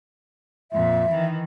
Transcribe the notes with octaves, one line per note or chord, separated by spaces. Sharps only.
F2 A#2 E5
D#3 E3